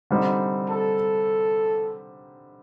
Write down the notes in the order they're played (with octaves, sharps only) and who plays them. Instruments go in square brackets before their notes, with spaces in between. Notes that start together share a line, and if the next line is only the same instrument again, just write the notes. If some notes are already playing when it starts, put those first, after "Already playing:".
[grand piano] D3 G3 C4 D#4
[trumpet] A4